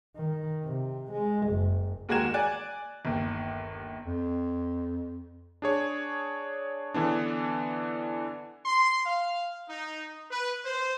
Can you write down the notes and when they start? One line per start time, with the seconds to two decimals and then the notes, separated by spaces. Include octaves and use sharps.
0.17 D#3
0.65 C3
1.12 G#3
1.48 F#1
2.09 D#2 G#3 F#4 A#4 G#6 E7
2.34 D5 G#5 F#6
3.05 G1 D#2
4.06 F2
5.62 D4 G#4 C#5
6.94 D3 E3 B3 D4
8.65 C6
9.05 F5
9.68 D#4
10.31 B4
10.64 C5